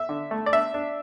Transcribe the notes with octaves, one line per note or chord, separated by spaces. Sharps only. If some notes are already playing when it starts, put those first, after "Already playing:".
Already playing: E5
D3
A3
D5
D4 E5
D4